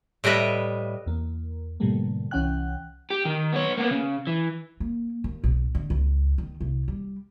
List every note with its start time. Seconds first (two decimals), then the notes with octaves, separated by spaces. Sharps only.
0.24 A2 G3 B4 D#5 E5
1.06 E2 A#3
1.80 G#2 B2 D3 G3 A3 A#3
2.31 C2 E3 C#4 F#5 G5 F#6
3.10 G4
3.25 D#3
3.53 B3 C#5
3.78 A#3 B3
3.91 C#3
4.27 E3
4.80 A#3
5.24 D#2
5.44 B1
5.75 D3
5.90 C#2
6.38 D#3
6.61 C2
6.88 G3